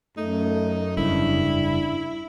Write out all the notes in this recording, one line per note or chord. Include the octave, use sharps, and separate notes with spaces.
F#2 A3 D#4
F1 G2 C#3 D4 E4